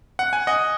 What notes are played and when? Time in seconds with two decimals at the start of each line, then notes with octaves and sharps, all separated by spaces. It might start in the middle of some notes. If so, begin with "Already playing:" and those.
0.19 F#5
0.33 G#5
0.47 D#5 F#5